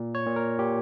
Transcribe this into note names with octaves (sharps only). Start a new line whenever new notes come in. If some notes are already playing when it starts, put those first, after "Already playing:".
Already playing: A#2
C#5
A#2
A#4
A#2 G4